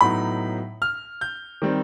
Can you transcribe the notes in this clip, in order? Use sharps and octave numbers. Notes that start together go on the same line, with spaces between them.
A2 F#3 B3 D#4 B5
F6
G6
D#3 G3 C4